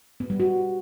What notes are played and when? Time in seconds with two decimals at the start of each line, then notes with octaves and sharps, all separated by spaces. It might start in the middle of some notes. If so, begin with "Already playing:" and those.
0.20 B3
0.30 G3
0.40 F#4